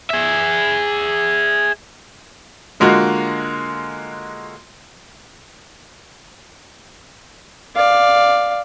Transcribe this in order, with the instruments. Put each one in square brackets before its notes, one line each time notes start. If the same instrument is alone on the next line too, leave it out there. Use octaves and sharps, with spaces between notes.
[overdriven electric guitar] G#4 E5
[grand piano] D3 G#3 A#3 F4 F#4
[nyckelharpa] D5 F5